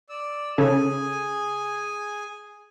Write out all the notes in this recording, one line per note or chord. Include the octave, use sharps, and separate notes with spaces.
D5 E6
C#3 C#4 G#4 A4 G#5